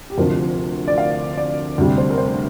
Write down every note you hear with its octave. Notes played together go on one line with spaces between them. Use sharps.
G4
D2 C3 F3 A#4
D5
F5
D5
D2 C3 G3
C5
A#4
C5